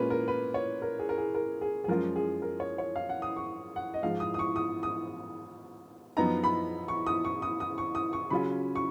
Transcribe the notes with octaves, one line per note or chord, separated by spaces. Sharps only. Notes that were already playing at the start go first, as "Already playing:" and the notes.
Already playing: A#2 G#3 C#4 F4 A#4 B4
A#4
B4
C#5
A#4
G#4
A#4
G#4
A#4
G#4
G#4
F#2 F3 G#3 C#4 F4 A#4
G#4
A#4
C#5
C#5
F5
F#5
D#6
C#6
F#5
D#5
G#2 F3 G#3 F5
D#6
D#6
C#6
D#6
D#6
F#2 F3 B3 D#4 A#5
B5
C#6
D#6
C#6
D#6
D#6
C#6
D#6
C#6
C#3 F#3 C#4 F4 B5
C#6